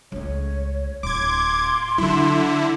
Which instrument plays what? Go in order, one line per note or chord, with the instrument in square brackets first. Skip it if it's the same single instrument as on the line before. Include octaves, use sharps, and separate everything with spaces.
[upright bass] C#2 A3 [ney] C#5
[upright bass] D1 [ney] C6 [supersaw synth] D6 G#6
[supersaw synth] D3 E4 [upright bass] F#3